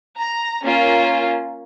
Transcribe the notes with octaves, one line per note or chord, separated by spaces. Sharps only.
A#5
A#3 C#4 F4